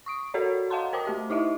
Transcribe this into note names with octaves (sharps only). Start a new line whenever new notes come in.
C#6 D#6 D7
F#4 A4 A#4 C#5 D5
D#5 F5 F#5 A5 A#5 C6
A#4 C5 G5 A5 D6 D#6
A3 G4 D6
D#4 E4 G4 D#5 E5